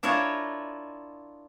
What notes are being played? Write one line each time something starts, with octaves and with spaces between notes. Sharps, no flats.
D4 E4 F4 A#4 C#5 D#5